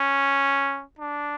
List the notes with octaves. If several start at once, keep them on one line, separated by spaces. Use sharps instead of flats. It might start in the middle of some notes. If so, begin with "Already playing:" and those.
Already playing: C#4
D4